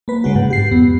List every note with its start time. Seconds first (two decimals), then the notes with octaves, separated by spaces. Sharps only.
0.08 A#3 B4
0.24 C#3 G#3 F#4
0.35 G#2 F#5
0.50 G4 C7
0.71 F2 B3